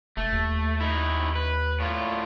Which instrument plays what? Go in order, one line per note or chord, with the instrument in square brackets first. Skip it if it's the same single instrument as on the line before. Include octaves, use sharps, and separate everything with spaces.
[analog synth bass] E1 [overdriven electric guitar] A3
[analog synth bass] D#2
[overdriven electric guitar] D#3 E4
B4
A2 F4